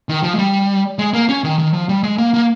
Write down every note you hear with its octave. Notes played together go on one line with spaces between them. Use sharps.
D#3
F3
G#3
G3
G#3
A#3
C#4
D#3
D#3
F3
G3
G#3
A#3
A#3